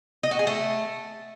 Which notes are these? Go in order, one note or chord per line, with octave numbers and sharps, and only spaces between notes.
D#5
F#4
G#4
A3